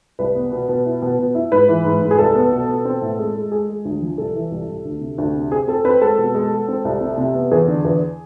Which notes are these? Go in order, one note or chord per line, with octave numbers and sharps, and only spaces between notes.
C2 B4
B3
B2
B2
E4
B2
B2
E4
G#2 B4
E3
G#2
G#2
G#4
C2 A4
B3
B2
B2
C4
A2
G#3
G#3
G#3 G#4
G#3
D2
F3
C2 A4
E3
C2
C2
D2
C3
D2
C3
C4 G#4
C4 A4
C4 B4
G#3 A4
B2
G#3
G#3
C4
C2
C3
C3
B3
E2 G#4
D3
E2